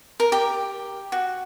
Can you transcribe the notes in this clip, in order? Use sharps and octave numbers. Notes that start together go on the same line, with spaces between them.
A#4
G4
F#4